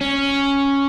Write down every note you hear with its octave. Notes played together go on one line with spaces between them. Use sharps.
C#4